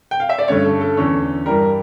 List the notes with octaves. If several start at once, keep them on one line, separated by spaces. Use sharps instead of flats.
G5
F5
E5
D5
G2 D3 A3 C#4 C#5
A4
A4
E2 D3 A3 C#4
G2 E3 G3 A#4